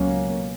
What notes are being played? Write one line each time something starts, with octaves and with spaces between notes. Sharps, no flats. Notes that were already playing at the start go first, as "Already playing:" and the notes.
Already playing: C#2 B2 F#3 A#3 C#4